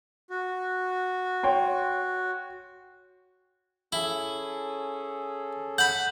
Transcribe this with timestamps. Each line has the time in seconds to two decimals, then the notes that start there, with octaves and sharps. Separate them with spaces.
0.30 F#4
1.43 C#5 G5 C6
3.92 C#4 E4 G#4 A4
5.78 F#5 B5 G6